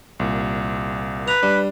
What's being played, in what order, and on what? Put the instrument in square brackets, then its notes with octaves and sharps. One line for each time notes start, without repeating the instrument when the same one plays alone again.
[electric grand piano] C2 A#2
[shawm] B4 [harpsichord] A#5
[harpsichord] G3 [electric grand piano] D4